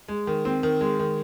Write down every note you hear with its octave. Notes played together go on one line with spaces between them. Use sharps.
G#3
D#3
C4
D#3
G#3
D#3